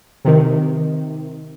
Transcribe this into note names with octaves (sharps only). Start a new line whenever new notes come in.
C3 D#3